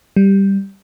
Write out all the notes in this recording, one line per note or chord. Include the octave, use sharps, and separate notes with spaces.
G3